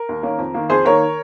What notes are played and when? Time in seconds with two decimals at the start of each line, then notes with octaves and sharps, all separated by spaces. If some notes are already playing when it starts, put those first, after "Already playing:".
Already playing: A#4
0.09 D#2
0.23 D#3 A#3 C#4
0.39 F2
0.54 D#3 A#3
0.69 F2 G#4 C5
0.85 D#3 A#3 A#4 C#5